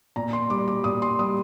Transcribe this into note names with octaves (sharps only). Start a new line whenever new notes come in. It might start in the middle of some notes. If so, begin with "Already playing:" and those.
A#2 A#5
C6
G3 D6
D6
A#2 D#6
C6
G3 D#6